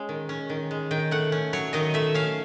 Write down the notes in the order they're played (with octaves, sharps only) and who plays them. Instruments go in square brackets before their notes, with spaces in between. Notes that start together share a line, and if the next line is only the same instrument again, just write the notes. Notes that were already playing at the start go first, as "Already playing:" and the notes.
Already playing: [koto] G#3 C#4
D#3
C#4
D#3
G#3
D#3 G5
A3 F#5
C#4
F#3 C#5
D#3 D#5
A3 E5
C#4 F5